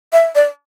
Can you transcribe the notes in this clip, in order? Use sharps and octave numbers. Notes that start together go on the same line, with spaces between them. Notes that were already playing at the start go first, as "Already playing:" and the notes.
E5
D5